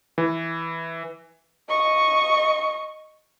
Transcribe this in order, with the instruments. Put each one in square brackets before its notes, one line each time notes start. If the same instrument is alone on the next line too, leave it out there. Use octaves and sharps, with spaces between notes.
[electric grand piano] E3
[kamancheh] D#5 C#6